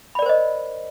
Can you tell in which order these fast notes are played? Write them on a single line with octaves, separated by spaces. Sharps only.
B5 D5 A#4 C5 D#5